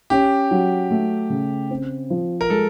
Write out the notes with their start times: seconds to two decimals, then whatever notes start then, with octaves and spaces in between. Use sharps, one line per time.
0.10 C#4 G4
0.51 F#3
0.91 A3
1.30 C#3
1.70 C4
2.10 F3
2.41 A#4
2.50 G#3 A4